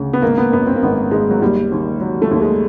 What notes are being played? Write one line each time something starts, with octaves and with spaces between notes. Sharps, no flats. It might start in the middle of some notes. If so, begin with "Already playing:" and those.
Already playing: D2 C#3
B3
G#1 A#3
B3
F#2 B3
C4
A#3
G#1 B3
G#1 G#3
F#3
D#2 G3
D#2
F#3
A3
D#2
G#3